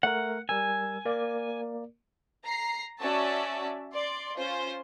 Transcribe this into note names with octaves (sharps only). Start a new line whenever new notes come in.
A3 A#4 F#5
G3 A#4 G#5 E6
A#3 A#4 D5
A#5 C7
C#4 F#4 D5 E5 A5
D5 C6
C#4 F4 C5